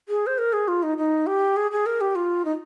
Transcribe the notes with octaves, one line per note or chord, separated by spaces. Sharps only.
G#4
C5
A#4
G#4
F4
D#4
D#4
G4
G#4
G#4
A#4
G4
F4
D#4